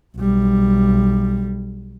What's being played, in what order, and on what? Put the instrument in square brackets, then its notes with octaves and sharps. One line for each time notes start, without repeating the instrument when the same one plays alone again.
[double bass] B1 G3